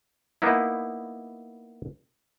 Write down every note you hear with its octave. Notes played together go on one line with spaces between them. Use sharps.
A#3 B3 D#4 E4